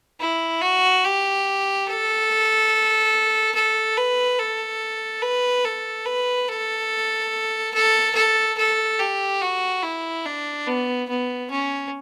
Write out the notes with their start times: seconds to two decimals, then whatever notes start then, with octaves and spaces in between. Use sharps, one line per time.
0.20 E4
0.62 F#4
1.04 G4
1.87 A4
3.55 A4
3.97 B4
4.39 A4
5.23 B4
5.65 A4
6.06 B4
6.48 A4
7.74 A4
8.15 A4
8.58 A4
9.00 G4
9.42 F#4
9.83 E4
10.26 D4
10.67 B3
11.09 B3
11.51 C#4